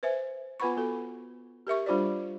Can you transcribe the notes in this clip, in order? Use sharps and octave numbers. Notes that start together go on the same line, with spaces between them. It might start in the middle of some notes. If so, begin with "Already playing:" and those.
B4 C5 E5 G#5
B3 F4 B4 F#5 B5 C#6
B3 F#4 A4
G4 A#4 E5 C#6
G3 D4 F4 G4 C5 D5